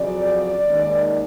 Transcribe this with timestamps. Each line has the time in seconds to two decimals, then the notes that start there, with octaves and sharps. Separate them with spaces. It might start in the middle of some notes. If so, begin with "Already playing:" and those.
Already playing: F2 C#3 F#3 D5
0.68 D#2 D#3 G#3 C#4